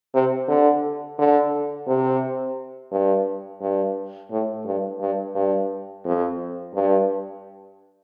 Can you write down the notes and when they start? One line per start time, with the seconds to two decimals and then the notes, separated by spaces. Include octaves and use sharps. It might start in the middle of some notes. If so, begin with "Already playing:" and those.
0.14 C3
0.48 D3
1.18 D3
1.87 C3
2.92 G2
3.61 G2
4.31 A2
4.66 G2
5.00 G2
5.35 G2
6.05 F2
6.75 G2